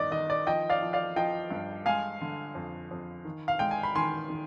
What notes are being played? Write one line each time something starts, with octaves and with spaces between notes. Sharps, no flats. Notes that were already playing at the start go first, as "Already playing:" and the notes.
Already playing: G1 D#3 D5 D#5
D#3 D#5
D5
F3 D#5 G5
D5 F5
F3
D5 F5
F3 D#5 G5
G2
G#3 F5 G#5
D3
F2
F2
D#3
F5
G#3 G5
G#5
B5
D#3 G#5 C6
D#3